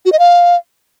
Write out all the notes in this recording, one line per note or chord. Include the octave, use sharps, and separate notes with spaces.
F#4
D#5
F5